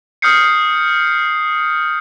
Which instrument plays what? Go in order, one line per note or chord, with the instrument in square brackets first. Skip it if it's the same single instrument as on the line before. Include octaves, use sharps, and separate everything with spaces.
[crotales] D#6 F6 G6 C7 C#7